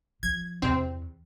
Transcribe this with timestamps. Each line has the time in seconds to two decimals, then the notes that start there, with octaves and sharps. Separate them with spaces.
0.23 F3 G#6
0.62 E2 C3 C4